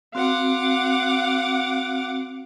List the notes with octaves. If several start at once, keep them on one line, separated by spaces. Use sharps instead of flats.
C4 F#4 F5 F#5 D6